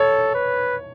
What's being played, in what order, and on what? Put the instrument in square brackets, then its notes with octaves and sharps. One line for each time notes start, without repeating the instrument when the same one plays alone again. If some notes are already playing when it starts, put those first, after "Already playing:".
Already playing: [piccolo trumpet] A4 [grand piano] C#5
[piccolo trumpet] B4